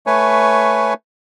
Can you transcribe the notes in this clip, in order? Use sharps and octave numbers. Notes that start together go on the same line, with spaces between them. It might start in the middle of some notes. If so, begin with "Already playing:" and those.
A3 B4 C#5 G#5